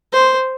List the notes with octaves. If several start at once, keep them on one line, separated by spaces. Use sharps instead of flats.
C5